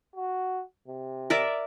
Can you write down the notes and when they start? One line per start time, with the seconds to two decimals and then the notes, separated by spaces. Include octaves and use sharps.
0.16 F#4
0.88 C3
1.30 A#4 D5 E5